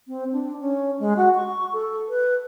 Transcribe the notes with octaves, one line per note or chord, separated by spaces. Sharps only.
C4
D4
C#4
G#3
F#4
C#6
A4
B4